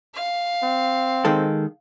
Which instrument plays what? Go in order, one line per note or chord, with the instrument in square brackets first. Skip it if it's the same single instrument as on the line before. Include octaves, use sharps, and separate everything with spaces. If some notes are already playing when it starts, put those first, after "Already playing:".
[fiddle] F5
[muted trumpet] C4
[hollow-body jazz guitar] D#3 G#3 A4